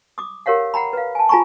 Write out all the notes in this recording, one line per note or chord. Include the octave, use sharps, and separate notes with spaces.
D6 D#6
G4 A#4 C#5 F5 F#5
F#5 G5 A#5 B5
B4 F5
G#5 A5
F4 G#4 G#5 A#5 B5 C#6